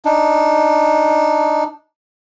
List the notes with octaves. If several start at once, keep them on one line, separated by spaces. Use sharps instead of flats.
D4 D#4